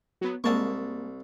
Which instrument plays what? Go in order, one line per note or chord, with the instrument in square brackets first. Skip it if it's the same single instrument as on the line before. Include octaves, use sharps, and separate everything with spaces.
[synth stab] F#3 B3
[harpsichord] C2 A5 C#6 [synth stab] G#3 A#3